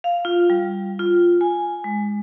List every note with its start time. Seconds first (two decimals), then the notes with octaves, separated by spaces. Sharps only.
0.04 F5
0.25 F4
0.50 G3
0.99 F4
1.41 G#5
1.84 G#3